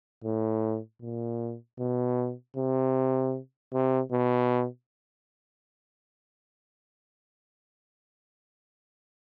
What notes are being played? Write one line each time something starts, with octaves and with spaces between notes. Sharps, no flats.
A2
A#2
B2
C3
C3
B2